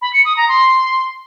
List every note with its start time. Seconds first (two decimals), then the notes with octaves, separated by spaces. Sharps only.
0.01 B5
0.13 C#7
0.25 D#6
0.37 A#5
0.48 C6